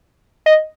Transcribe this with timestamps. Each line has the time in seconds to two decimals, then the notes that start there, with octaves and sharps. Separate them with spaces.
0.46 D#5